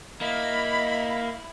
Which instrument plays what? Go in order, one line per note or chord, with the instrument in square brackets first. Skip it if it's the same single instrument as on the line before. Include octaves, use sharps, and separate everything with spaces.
[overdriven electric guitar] A#3 [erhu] E4 [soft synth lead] D#5 [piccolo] B5